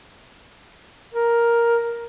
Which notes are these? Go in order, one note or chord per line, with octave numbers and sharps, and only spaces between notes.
A#4